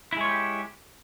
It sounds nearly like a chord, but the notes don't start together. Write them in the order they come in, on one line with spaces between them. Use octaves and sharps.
E4 G#3 C#5 F4 G4